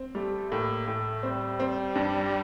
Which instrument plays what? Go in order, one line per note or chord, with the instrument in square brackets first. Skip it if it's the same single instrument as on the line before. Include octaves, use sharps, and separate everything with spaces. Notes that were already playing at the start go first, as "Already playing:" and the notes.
Already playing: [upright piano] C4
[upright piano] G3 [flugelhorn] A3
[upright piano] A2 [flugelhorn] A#3
[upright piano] A2 [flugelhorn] A3
[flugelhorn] G3 [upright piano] C4
[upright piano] C4
G2